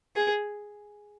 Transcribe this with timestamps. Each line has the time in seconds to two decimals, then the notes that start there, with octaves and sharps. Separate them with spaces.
0.16 G#4